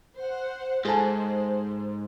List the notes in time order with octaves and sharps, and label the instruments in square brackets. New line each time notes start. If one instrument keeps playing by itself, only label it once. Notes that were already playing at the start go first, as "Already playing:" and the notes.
[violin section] C5 F#5
[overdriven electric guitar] G#2 [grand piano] G#4 A5 [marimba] A4 G#5 [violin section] C5